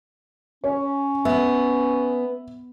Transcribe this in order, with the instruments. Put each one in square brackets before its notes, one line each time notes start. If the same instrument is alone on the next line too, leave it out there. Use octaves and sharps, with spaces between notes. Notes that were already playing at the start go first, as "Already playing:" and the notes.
[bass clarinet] C#4 [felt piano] C#5
[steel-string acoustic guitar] B3 [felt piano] E5